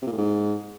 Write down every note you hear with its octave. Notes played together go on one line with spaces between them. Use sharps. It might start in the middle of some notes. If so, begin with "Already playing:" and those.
C3
A#2
A2
G#2